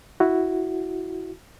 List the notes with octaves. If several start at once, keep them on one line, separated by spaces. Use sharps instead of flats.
E4 F#4